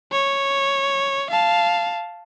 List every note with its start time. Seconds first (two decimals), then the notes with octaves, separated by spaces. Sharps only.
0.12 C#5
1.31 F5 A5